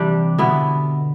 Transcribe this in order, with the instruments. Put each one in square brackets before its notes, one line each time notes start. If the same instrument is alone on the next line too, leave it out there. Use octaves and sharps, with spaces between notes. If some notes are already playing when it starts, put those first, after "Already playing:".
Already playing: [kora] C3 G3 D4 G4 [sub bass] E3
[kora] B2 B3 E4 [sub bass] D3